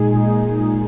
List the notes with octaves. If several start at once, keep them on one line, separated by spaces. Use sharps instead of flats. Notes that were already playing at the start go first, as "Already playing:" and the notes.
Already playing: A#2 G#3 D#4 G#4
A#2 G#3 D#4 G#4